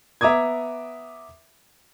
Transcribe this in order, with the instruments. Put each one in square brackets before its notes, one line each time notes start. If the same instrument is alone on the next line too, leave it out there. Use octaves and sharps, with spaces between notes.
[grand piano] B3 E5 A#5 D6 D#6 G#6